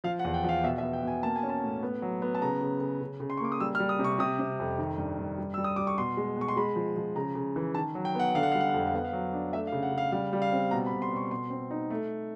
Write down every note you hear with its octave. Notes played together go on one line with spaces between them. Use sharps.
F3 F5
F#5
E2
G5
F3 F5
B2 E5
E5
B3
G5
B2 G#5
A#3 A5
G#5
C#4
A5
A2
B3
F#3
B3
A5
C#3 A#5
C#3
C#3
C#3
C#3
C6
C#6
A#3 D6
D#6
G3 E6
F6
G3
D#6
C3
C#6
C3 D#6
C3
F2
D#3
G2
G2
G3
G3 E6
D#6
G3 D6
C#6
B2 C6
G#3
B2 C#6
C6
G#3 B5
F3
F3
C#3 A#5
C#3
E3
D#3 A5
F#3
G5
B3 F#5
D3 F5
F#5
G3 F5
F#5
F5
F2 F#5
F5
B3 F#5
F5
F#3
D4
A3 E5
F5
C#3
F#5
C#3
F5
G3 F5
G3
F5
C4
B2 A#5
B5
B2
C6
B2 C#6
B2 C6
C4
D#4
A3